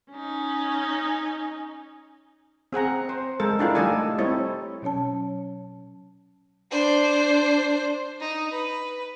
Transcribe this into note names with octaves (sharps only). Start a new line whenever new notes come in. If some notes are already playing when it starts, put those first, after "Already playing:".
C#4 D#4
C4 G#4 F#5 A#5
C5
G#3 A4 A#4
D4 E4 F4 A#4
G3 A3 D#4 A4 D5 G#5
G3 C4 D#4 E4 A4 C#5
B2 F#3 C#4 C#5 A5
D4 C5
D#4
B4